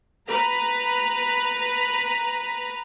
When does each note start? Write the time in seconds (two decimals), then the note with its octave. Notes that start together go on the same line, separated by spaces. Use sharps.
0.27 B4 A#5